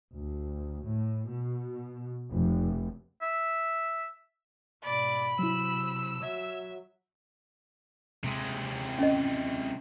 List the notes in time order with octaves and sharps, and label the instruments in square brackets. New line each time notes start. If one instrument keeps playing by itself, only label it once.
[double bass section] D2
A2
B2
F1
[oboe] E5
[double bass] G#2 B2 [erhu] D5 [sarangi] B5
[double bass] C3 [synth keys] F#3 E4 [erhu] E6
[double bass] F#3 [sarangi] E5 [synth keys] G#6
[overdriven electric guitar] C3 G#3
[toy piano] C#4 D#5